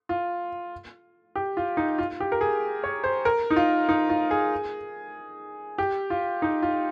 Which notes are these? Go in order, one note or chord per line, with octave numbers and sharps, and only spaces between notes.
F4
G4
F4
D#4
F4
G4
A#4
G#4
C#5
C5
A#4
D#4
F4
D#4
F4
G#4
G4
F4
D#4
F4